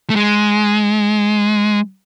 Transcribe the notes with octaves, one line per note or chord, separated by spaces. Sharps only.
A3
G#3